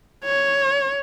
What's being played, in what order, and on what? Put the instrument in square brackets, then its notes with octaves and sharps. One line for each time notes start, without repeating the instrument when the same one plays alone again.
[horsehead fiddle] C#5